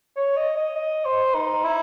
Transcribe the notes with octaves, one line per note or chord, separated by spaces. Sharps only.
C#5
D#5
D#5
D#5
C5
D#4
E4